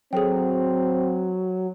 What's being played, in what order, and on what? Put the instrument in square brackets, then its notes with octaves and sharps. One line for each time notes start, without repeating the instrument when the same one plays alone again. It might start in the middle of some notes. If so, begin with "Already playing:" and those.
[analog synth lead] F#3 [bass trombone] C4 [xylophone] G#4 A4 G5